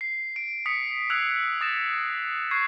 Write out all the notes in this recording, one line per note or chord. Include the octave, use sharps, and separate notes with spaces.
C7
D7
D#6 B6 C#7
D#6 E6 F#6 G#6 C7 F7
D#6 A6 A#6 E7
C#6 F#6 G#6 C7